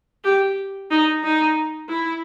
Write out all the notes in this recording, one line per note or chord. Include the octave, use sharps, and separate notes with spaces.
G4
D#4
D#4
E4